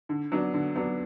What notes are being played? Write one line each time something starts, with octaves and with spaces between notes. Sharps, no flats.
D3
F#3 B3 D4
D3
F#3 B3 D4